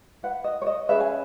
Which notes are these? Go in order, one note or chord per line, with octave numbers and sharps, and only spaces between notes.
E4 B4 F#5
D#5
C#5
D#5
C#4 G#4 B4 E5
G#5